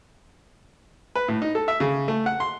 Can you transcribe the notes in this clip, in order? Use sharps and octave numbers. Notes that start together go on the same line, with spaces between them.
B4
A2
D#4
A4
E5
C#3
A3
F#5
C6